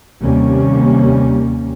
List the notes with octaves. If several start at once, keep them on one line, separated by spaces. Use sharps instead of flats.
D#2 C3 G3 A#3 C#4